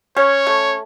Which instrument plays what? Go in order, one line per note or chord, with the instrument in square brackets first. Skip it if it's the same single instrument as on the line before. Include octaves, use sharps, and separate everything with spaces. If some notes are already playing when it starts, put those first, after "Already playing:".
[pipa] C#4 [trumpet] C#5
[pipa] A3